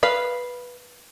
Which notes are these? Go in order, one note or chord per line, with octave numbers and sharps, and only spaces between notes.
B4 F5 B5